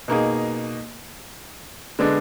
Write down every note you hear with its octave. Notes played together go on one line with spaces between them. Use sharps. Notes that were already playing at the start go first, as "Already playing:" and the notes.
B2 A#3 D#4 G#4
D3 G#3 B3 D4